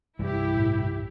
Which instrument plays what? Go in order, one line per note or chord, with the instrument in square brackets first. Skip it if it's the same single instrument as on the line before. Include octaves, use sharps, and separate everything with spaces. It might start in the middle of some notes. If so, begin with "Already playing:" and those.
[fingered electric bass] C2 G2 E3 [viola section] E4 G4
[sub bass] A2